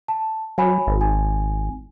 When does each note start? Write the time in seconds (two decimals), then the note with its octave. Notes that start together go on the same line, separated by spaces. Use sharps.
0.08 A5
0.58 F#3 C#5 G#5 B5
0.87 G#1
1.01 G#5